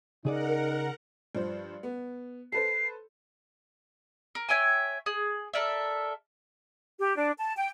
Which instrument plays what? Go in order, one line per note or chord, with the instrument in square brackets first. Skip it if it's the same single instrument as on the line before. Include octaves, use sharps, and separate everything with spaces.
[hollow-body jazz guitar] C#3 G#4 D5 [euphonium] D#4 [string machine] A#4 F#5
[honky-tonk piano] G2 F3 C5
B3
[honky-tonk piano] A4 B4 C5 [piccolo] C7
[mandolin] A#4
C#5 E5 G5 G#5
G#4
A4 A#4 D5 E5
[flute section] G4
D4
A5
G5